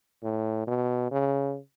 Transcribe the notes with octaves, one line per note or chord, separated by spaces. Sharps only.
A2
B2
C#3